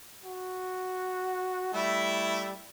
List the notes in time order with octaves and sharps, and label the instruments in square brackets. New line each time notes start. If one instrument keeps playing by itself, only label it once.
[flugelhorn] F#4
[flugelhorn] G3 [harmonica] A3 E4